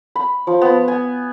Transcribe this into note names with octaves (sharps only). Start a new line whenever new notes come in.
B5
F3
B3
G#5